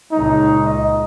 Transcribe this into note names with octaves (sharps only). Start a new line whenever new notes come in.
C#2 A#2 D#4
D#5